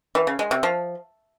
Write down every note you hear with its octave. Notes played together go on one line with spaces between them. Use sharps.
E3
C#3
G#3
C3
F3